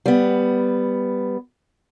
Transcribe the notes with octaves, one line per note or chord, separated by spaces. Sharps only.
G3 B3